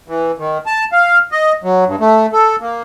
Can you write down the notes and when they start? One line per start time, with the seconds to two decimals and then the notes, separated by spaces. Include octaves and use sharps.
0.08 E3
0.38 D#3
0.66 A5
0.92 F5
1.32 D#5
1.63 F#3
1.87 G2
2.00 A3
2.33 A4
2.60 A#3